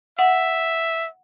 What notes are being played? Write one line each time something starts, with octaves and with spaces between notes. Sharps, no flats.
E5 F#5